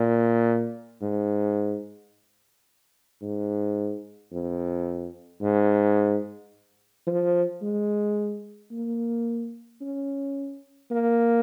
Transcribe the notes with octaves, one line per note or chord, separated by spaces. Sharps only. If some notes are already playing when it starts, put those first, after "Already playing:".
Already playing: A#2
G#2
G#2
F2
G#2
F3
G#3
A#3
C#4
A#3